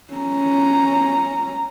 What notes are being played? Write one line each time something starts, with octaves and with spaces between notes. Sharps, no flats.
C#4 A#5